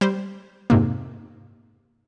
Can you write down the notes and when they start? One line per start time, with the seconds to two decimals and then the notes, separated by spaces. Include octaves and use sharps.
0.01 G3 C5
0.70 F2 G#2 C3 A#3